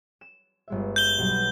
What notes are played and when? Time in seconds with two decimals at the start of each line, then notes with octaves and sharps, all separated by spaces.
0.21 E7
0.68 G1 G#3 E5
0.96 G6 G7
1.18 B1 F#3 G3